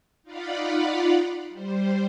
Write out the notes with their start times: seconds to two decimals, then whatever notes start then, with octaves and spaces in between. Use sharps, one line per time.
0.23 D#4 F4 D5 F5 F#5 B5
1.50 G3 C5